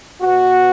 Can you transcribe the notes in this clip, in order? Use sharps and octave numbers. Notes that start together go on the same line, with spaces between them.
B2 F#4